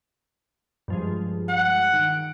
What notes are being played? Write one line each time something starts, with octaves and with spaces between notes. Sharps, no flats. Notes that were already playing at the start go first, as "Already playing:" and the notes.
G2 F3 G#3
F#5
D#3 D7